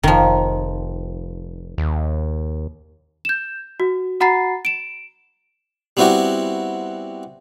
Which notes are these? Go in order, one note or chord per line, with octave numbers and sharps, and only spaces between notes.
F1 D#3 F3
D#2
G6 E7
F#4
F#4 F#5 A#5 B5 A6 C7
D7 E7
G3 B3 C4 E4 F#4 G4